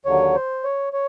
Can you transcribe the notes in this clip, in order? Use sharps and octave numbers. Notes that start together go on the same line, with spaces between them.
D#2 D3 F#3 C#5
C5
C#5
C#5